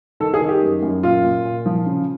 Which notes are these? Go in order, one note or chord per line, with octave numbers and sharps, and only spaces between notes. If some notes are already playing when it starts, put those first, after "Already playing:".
D#3 A4
G#4
D#3
G4
F#2
F#2
A#2 F4
A#2
A#2
F3
C#3